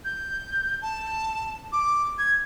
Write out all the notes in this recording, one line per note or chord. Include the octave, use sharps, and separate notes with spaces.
G6
A5
D6
G#6